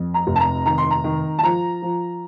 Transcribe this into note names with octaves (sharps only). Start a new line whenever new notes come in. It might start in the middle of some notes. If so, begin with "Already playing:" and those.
Already playing: F2
A#5
F1
A5
A#5
D#3 A#5
C6
A#5
D#3
A5
F3 A#5
F3